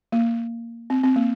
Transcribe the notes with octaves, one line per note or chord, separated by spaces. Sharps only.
A#3
C4
C4
A#3